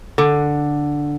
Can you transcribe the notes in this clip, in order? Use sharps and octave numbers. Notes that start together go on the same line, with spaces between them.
D3